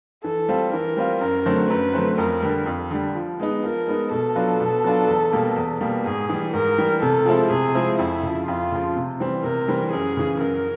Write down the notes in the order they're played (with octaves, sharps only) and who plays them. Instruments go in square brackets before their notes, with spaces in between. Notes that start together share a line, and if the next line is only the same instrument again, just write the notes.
[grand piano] E3 [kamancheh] A4
[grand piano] G3 C4 F4
[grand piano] E3 [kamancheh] A#4
[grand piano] G3 C4 F4
[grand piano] F#2 [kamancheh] A#4
[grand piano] D3 F#3 A3 C4
[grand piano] F#2 [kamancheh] B4
[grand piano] D3 F#3 A3 C4
[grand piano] F2 [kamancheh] A#4
[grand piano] D3 G3
F2
D3 G3
F3
G#3 B3 D#4
[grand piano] F3 [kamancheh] A#4
[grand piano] G#3 B3 D#4
[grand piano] B2 [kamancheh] A4
[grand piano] F#3 B3 D4 F4
B2
F#3 B3 D4 F4
E2
B2 G3 A#3
E2
B2 G3 A#3
[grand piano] G#2 [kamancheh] G#4
[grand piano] E3 G3
[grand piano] G#2 [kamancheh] A#4
[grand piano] E3 G3
[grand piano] C3 [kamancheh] A4
[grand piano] F3 G#3 C4 E4
[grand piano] C3 [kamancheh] G#4
[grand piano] F3 G#3 C4 E4
[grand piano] F2 [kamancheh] E4
[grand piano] C#3 F3
[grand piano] F2 [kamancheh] F4
[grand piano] C#3 F3
C3
E3 G3 C4
[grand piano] C3 [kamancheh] A#4
[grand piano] E3 G3 C4
[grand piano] F#2 [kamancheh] G#4
[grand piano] C#3 E3
[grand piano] F#2 [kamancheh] A#4